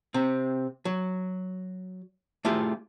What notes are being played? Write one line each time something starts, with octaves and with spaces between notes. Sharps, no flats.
C3 C4
F#3
A3 E4 F4 G4 G#4